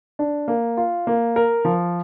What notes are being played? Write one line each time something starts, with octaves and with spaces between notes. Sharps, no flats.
D4
A#3
F4
A#3
A#4
F3